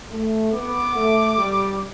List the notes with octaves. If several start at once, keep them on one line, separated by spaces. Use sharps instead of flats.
A3
B3 D6
A3
G3